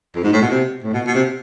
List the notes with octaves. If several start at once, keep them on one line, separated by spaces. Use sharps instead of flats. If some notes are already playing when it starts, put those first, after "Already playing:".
F2
G#2
A2
B2
C3
A2
B2
B2
C3